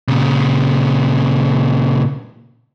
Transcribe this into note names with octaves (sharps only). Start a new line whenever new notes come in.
A#2 C#3